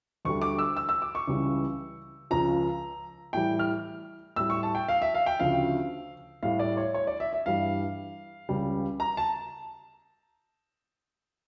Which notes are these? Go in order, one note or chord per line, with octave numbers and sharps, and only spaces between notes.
D2 D3 G3 C#6
D6
E6
E6
E6
D6
C#6
C#2 C#3 E3 G3
C#2 C#3 F3 A#5
A2 E3 G3 G5
F6
A2 G3 E6
C#6
A5
G5
F5
E5
F5
G5
D2 C#3 F3 F5
A2 G3 F5
D5
C#5
C#5
D5
E5
E5
G2 E3 G3 F5
C#2 C#3 G3
A#5
A5